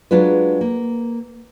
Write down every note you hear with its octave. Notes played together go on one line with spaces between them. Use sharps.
F#3 G#3 D4 F4 B4
A#3